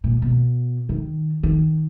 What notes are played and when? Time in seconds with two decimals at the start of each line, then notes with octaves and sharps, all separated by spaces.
0.04 A#2
0.22 B2
0.89 D#3
1.43 D#3